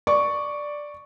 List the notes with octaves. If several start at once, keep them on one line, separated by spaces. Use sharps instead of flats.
D5 C#6